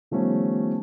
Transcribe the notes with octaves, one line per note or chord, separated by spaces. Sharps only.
D#3 F3 G3 A3 B3 C#4